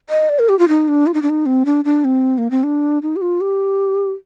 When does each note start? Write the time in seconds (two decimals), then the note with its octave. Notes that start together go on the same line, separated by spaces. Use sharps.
0.10 D#5
0.29 D5
0.39 A#4
0.49 G4
0.59 F4
0.68 D#4
0.88 D4
1.07 F4
1.14 D#4
1.22 D4
1.30 D#4
1.46 C4
1.66 D4
1.85 D4
2.05 C4
2.38 A#3
2.51 C4
2.63 D4
3.03 D#4
3.16 G4
3.22 F4
3.41 G4